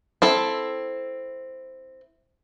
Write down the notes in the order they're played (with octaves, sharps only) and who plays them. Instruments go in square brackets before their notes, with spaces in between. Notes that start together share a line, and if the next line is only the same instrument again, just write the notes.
[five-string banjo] C4 E4 A4